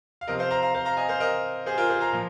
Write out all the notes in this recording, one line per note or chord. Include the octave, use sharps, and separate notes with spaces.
F5
C3 F3 C4 A#4 D#5
C5 F5
F5 A#5
F5 A#5
C5 F5
F5 A#5
D#5 G#5
C5 F5
A#4 D#5
G#4 C5
F4 A#4
G#4 C5
F5 A#5
A#2 F3